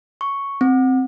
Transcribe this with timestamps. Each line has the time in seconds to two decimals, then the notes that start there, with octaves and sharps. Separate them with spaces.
0.21 C#6
0.61 C4